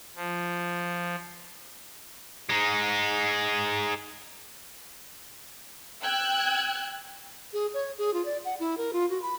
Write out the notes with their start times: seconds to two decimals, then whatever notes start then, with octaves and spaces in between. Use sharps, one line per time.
0.16 F3
2.49 G#3 D#4
6.02 G5 E6 F#6 G#6
7.53 G#4
7.74 C#5
7.98 G#4
8.14 F4
8.25 D5
8.45 F#5
8.59 E4
8.78 A#4
8.93 F4
9.10 F#4
9.22 B5